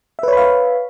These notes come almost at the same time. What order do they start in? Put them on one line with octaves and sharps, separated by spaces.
E5 B4 C#5 B5 F5